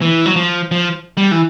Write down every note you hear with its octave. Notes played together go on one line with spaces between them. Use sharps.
E3
F#3
F3
F3
G3
E3